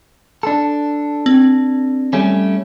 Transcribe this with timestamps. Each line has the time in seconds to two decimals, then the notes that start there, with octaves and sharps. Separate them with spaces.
0.43 D4 A4
1.26 C4
2.13 G3 A3 C#4